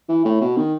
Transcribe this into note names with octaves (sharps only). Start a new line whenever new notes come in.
E3
A2
B2
D#3